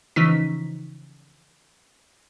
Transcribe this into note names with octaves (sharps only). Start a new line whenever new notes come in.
C#3 E3 F3 D#4 B6